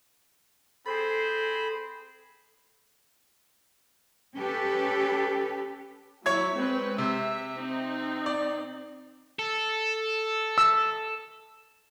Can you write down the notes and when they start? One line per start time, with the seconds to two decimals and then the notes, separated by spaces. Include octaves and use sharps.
0.86 C4 G#4 A4 C5 B5
4.37 C#4 G4 A4 B4
6.26 F#3 E4 C#5 G#6
6.57 G#3 C4 B4
6.98 C3 E5
7.56 C4 D#4
8.26 D5
9.39 A4
10.58 E6